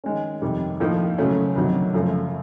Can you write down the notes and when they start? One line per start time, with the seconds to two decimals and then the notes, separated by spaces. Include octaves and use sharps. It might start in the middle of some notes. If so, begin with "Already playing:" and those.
0.04 D#3 G#3 C#4
0.41 F2 C3 D#3 G3
0.80 A2 F3 A#3 D#4
1.18 C#3 F#3 A3 C#4
1.56 D2 C3 D#3 F#3
1.94 F#2 C#3 F3 A3